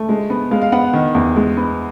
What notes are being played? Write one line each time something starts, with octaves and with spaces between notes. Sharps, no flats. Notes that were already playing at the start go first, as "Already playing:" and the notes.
Already playing: A3
G#3
B3
G#3 F5
F5
B3 F#5
D#3
E2
G#3
B3